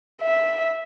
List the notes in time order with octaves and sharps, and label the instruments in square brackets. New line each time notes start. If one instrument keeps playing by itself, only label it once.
[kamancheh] E5